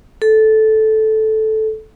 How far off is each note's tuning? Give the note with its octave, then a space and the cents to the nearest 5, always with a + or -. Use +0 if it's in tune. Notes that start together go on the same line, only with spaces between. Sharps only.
A4 -10